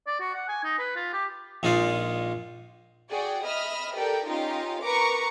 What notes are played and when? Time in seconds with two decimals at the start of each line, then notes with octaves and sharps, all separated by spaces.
0.07 D5
0.20 F#4
0.34 F#5
0.48 G#5
0.64 D#4
0.79 B4
0.96 F4
1.13 G4
1.63 A#1 G#3 D#4 F4 D5
3.10 F#4 G#4 D5 G5
3.45 D#5 E5 B5 D#6 F6
3.96 G4 A4 A#4 D5 G5
4.27 C#4 D#4 F4 G4 D#5 F5
4.83 A#4 B4 A#5 C#6 D6